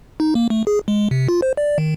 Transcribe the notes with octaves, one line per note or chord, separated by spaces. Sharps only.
D#4
A#3
A3
G#4
G#3
C3
F4
C5
D5
D#3